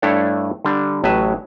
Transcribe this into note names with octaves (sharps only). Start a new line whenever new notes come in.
G2 A3 D4 E4 A4 C#5
D3 G3 D4
A1 A2 F#3 B4 E5